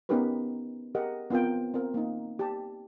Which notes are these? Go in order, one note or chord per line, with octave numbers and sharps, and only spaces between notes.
B3 C#4 D#4 G4 A#4 B4
G4 G#4 A#4 D#5 F#5
B3 C4 F4 A#4 G5
C4 A#4
A#3 D#4
G4 A5